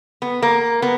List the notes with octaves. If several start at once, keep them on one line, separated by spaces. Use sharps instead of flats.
B3
A#3
B3